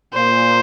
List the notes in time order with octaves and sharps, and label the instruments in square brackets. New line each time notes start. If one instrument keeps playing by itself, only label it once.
[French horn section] A#2 [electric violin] C5